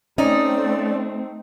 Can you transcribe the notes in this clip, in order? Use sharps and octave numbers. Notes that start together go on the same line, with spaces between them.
A3 C4 C#4 D#4 D5